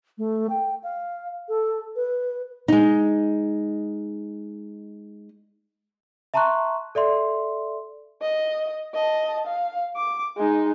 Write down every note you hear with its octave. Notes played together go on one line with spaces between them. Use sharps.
A3
G5
F5
A4
B4
G#3 D#4
E5 A5 A#5 C6 C#6 F#6
A4 D5 E5 C6
D#5
D#5 A5
F5
D6
G#3 D#4